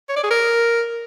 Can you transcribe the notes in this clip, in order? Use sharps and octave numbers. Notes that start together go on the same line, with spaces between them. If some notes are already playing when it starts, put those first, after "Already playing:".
C#5
D5
G#4
A#4